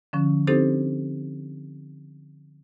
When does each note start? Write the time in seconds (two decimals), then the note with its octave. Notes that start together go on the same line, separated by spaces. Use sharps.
0.13 D3 F3 C#4
0.47 C4 D4 D#4 G4 A4 C5